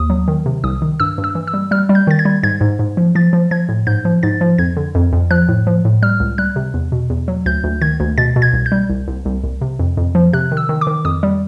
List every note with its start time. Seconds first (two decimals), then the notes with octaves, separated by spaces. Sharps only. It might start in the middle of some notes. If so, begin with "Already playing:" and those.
Already playing: D#2 D#6
0.10 F#3
0.28 D#3
0.46 C3
0.64 C2 D#6
0.82 D#3
1.00 G2 E6
1.18 G2
1.24 E6
1.35 E3
1.47 E6
1.54 G3
1.71 G3 F6
1.89 G3
1.95 G6
2.07 D#3 A6
2.19 G#6
2.25 G3
2.43 G#2 G#6
2.61 G#2
2.79 G#2
2.97 F3
3.15 F3 A6
3.33 F3
3.51 F3 G#6
3.69 A2
3.87 G#2 G6
4.05 F3
4.23 G#2 A6
4.41 F3
4.58 F2 G#6
4.77 D3
4.95 F2
5.13 F2
5.31 F3 F#6
5.48 A2
5.67 F3
5.85 A2
6.02 G3 F6
6.20 C#2
6.38 G3 F#6
6.56 C3
6.74 E2
6.92 B2
7.10 E2
7.28 F#3
7.46 D2 G6
7.64 D2
7.82 D#3 G#6
8.00 D2
8.18 B2 A6
8.36 B2
8.42 G#6
8.53 C2
8.66 G6
8.72 G3
8.90 C2
9.08 C2
9.25 C2
9.44 C2
9.61 C3
9.79 F2
9.97 F2
10.15 F3
10.33 C3 F#6
10.52 D#3
10.57 E6
10.69 D#3
10.81 D6
10.87 D#3
11.05 F2 D#6
11.23 G3